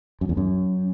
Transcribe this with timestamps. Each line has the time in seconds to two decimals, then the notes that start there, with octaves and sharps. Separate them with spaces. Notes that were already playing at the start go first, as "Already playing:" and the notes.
0.21 F#2
0.29 E2
0.37 F#2